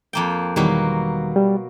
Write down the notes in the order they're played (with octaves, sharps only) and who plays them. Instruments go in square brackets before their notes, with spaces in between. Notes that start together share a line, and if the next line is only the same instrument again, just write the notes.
[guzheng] F2 A#3 G5
[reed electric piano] E2 D#3 G3 [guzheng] B2 F#3 A#3
[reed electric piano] G3